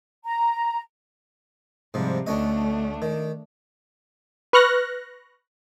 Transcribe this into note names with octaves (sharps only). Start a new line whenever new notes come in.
A#5
G#2 C3 F3 G3
D2 A3 C#4 D4 D#5
D#3
B4 C#6 F6 F#6 A#6